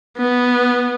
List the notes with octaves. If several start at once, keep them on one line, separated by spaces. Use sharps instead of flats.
B3